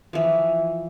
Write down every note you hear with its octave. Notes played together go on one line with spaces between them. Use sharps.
E3 F3